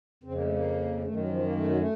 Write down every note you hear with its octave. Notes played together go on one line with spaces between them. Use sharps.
F2 C#3 C4
A#3
A3
A#3
F#2 D#3 A3
F#3
F3
A#3
A3
F#3
A3